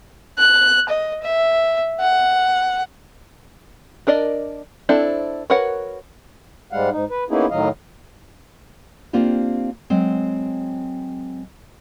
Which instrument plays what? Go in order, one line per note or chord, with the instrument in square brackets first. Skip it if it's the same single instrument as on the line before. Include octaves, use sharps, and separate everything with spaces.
[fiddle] F#6
D#5
E5
F#5
[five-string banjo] D4 A#4 D5 D#5
C4 D4 E4 A4 C5
F#4 A#4 B4 C#5 F#5
[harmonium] G#2 G3 G#3 F5 F#5
G#2 D#4
B4
A#3 B3 C#4 D#4 E4 G#4
A2 D#3 F#3 D#5 F5
[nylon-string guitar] A#3 C4 D4 F4 G4
F#3 G#3 C4